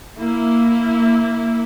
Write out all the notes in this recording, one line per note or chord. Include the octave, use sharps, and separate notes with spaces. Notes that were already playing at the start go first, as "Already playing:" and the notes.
A#3 E4